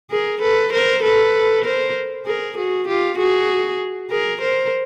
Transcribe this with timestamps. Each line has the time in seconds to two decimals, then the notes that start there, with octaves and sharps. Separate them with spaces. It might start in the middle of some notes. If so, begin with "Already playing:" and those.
0.11 G#4 A#4
0.41 A4 B4
0.72 A#4 C5
1.03 A4 B4
1.65 A#4 C5
2.26 G#4 A#4
2.57 F#4 G#4
2.88 F4 G4
3.18 F#4 G#4
4.10 G#4 A#4
4.41 A#4 C5